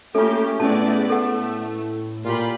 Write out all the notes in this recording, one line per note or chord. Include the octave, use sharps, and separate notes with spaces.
A3 A#3 C#4 F4 G4 A4
A2 G#3 A3 B3 C#4 D5 A5
A3 A4 F#5
A#2 F4 G4 B5